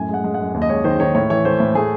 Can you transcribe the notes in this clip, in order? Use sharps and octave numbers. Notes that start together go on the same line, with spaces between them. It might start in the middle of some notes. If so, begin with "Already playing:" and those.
Already playing: F#2 A2 G#5
G#3 F#5
G#3
F#2 F#5
D#2
D#5
G#3 C#5
D#3 C5
D#3 C#5
A2 C#5
E3 C#5
A3 C5
A2
A3 G#4